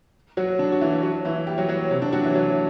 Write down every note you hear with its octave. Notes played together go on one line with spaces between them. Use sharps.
F#3 F#4
D3 D4
F#4
E3 E4
F#3 F#4
E3 E4
G3 G4
F#3 F#4
F#3 F#4
C3 C4
D3 D4
F#3 F#4
E3 E4
F#3 F#4